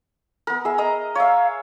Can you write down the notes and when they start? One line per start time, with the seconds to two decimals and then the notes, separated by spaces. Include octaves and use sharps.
0.47 B3 A#4
0.65 G#4 E5
0.78 D#5 A#5
1.15 C#5 E5 F5